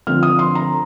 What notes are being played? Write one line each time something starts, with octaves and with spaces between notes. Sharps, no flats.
D3 F3 C4 F4 F6
D#6
C6
A#5